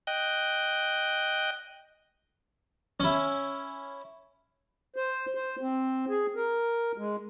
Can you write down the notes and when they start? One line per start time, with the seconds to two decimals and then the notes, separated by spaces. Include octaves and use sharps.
0.07 D#5 G5 F#6
3.00 C#4 E4
4.96 C5
5.35 C5
5.61 C4
6.09 G#4
6.36 A#4
6.98 G#3